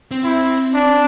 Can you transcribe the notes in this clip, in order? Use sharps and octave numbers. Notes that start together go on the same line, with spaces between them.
C4
E4
D4